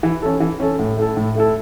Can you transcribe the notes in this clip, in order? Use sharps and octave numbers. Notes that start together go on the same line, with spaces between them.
E3
C#4 A4
E3
C#4 A4
A2
A3 E4 A4
A2
A3 E4 A4